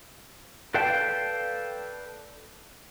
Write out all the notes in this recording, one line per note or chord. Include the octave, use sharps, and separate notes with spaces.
A4 B4 D5 F5 G5 A5